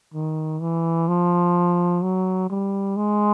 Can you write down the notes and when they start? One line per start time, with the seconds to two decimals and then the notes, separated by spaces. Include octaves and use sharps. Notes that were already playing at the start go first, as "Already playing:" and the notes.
0.14 D#3
0.61 E3
1.08 F3
2.02 F#3
2.50 G3
2.96 G#3